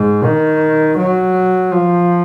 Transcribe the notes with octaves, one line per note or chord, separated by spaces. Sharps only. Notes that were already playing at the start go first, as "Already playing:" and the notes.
Already playing: G#2
D#3
F#3
F3